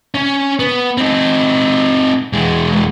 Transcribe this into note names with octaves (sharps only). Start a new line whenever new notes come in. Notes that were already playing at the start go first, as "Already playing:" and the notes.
C#4
B3
C4 D#4
E2 G#3